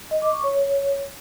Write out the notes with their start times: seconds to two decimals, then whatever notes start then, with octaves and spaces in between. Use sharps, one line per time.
0.11 D#5
0.22 D6
0.33 C#6
0.43 C#5